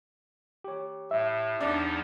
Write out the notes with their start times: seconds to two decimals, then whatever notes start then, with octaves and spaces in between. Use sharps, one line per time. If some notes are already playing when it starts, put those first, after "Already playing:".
0.64 G4 C#5
1.11 A2 E5
1.61 E2 F3 D4 D#4